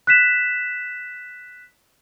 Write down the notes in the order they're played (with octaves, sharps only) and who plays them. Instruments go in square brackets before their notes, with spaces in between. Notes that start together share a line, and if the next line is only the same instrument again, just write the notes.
[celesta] F#6 B6 E7